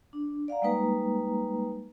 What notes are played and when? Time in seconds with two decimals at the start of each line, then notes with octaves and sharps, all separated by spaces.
0.13 D4
0.48 D5 F5 F#5 A#5
0.62 G3 G#3 A#3 D#4 B4 A#5